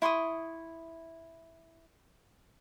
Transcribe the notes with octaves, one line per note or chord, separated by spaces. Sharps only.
E4 C6 C#6 D#6